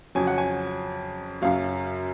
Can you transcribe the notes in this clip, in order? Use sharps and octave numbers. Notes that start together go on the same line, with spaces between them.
F2 C#3 F#3 G#5
F#5
G#5
F#2 C#3 F#3 F5